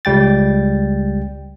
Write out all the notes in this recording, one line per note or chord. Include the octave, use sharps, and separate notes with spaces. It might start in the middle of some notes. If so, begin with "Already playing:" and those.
C#2 G3 G5 A6